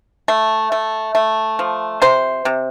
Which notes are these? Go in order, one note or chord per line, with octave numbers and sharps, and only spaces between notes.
A3
A3
A3
F3
C3 C5
C3